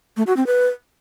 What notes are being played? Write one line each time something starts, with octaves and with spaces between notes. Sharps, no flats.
A3
F#4
C4
B4